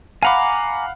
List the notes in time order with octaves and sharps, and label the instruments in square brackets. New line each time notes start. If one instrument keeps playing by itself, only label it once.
[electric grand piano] F5 F#5 B5 [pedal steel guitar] G#5 A#5 D6